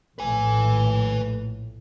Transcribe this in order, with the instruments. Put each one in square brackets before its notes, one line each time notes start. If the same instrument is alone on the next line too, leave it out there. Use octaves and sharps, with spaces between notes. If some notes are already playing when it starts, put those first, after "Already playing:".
[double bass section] A#1 A2 [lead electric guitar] B4 G#5